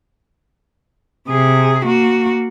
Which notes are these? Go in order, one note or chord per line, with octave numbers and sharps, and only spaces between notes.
C3 G#4
A#3 F#4